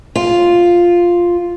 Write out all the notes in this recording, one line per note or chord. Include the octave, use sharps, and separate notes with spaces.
F4